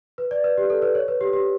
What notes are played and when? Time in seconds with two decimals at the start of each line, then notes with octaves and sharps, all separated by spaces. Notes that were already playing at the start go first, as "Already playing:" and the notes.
0.18 B4
0.31 D5
0.44 B4
0.58 G4
0.70 A4
0.82 B4
0.95 C#5
1.08 B4
1.21 G4
1.33 G4